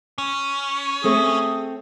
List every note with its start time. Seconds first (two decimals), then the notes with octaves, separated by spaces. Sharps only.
0.18 C#4
1.04 A3 C4 G#4 A4